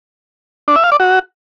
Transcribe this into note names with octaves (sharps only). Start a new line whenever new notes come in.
D4
E5
F5
D5
F#4